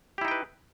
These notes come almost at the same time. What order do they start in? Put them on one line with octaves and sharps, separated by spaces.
G4 E4 D#4 G5 B4